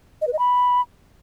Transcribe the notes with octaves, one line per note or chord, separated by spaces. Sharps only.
D#5
B4
D#5
B5